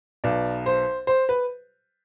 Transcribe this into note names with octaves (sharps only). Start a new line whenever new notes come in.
B1 B2 D5
C5
C5
B4